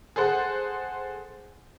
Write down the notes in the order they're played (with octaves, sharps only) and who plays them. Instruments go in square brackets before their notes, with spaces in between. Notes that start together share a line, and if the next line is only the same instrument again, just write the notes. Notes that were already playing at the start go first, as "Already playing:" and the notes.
[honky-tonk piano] G#4 A4 C5 F#5